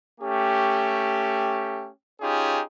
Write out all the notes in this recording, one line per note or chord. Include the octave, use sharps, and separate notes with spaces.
A3 C#4 G4
C#4 D#4 F4 G4 G#4